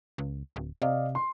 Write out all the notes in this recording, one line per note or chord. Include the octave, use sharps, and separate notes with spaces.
C#2
D1
C3 D5 D#5 F5
C6